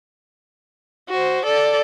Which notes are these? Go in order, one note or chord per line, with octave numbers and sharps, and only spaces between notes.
F#4 C5
A4 D5